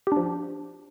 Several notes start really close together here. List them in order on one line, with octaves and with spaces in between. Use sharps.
G4 D4 F3